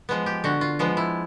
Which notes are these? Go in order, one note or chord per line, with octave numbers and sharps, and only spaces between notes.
F3 G#3 B3
G4
D3 F#4
F4
F3 G#3 B3
E4